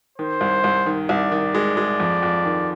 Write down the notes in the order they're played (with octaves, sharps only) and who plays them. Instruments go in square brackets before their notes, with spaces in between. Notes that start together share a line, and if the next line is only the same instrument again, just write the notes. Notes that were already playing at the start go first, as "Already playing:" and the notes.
[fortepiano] D#3 [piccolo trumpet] C5
[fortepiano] C2
C2
D#3
[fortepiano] C2 [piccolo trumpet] D5
[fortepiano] D#3
G#3
G#3
F2
F2
D#3